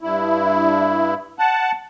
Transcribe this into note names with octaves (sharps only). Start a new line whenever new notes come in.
G2 E4
F#5 A5